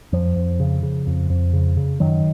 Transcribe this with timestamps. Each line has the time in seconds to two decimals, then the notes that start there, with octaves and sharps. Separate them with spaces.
0.12 F2 F3
0.36 F2
0.60 C#3
0.83 C#3
1.07 F2
1.30 F2
1.53 C#3
1.77 C#3
2.00 F#2 D#3 F#3